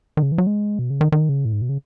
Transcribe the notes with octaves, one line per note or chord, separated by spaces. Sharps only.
D#3
C#3
E3
F#3
G#3
B2
C#3
D#3
D#3
C#3
A2
G#2
B2
C#3